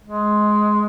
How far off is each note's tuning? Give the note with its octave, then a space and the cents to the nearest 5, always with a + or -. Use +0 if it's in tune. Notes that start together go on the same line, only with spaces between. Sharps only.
G#3 +15